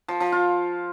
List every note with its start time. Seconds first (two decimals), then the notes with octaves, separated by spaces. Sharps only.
0.08 F3
0.20 F3
0.32 F4